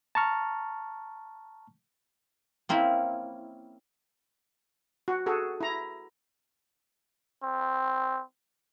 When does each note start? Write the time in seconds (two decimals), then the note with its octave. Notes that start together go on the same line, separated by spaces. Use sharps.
0.15 A5 A#5 C#6 F6
2.69 A#3 C4 C#4 E4
5.08 F#4
5.26 F#4 G#4 A4
5.61 E4 A#5
7.43 C4